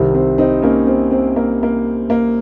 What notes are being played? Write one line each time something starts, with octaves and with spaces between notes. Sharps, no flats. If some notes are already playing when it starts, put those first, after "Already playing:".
Already playing: C2 C3 D#3
C4
C4 D#4
A#3 C#4
C4
C4
A#3
A#3
A#3